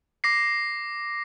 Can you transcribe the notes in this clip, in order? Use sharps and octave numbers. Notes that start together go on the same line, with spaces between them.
D6 A#6 C7